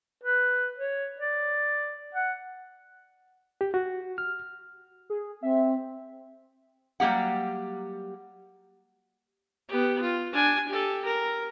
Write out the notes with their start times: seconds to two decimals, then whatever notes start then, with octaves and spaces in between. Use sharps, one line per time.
0.24 B4
0.77 C#5
1.20 D5
2.15 F#5
3.61 G4
3.74 F#4
4.18 F6
5.10 G#4
5.43 C4 E5
7.00 F#3 G3 A#3 G4 F#5
9.69 B3 G4
10.02 F4
10.33 D4 G#5
10.68 G4 A4
11.05 A#4